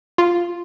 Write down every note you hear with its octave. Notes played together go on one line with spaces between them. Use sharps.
F4